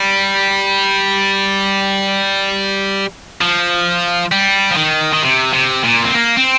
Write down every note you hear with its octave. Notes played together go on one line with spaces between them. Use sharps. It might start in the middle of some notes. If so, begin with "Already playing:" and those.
Already playing: G3
F3
G3
F3
D#3
D#3
C3
C3
A#2
C4
A#3
C4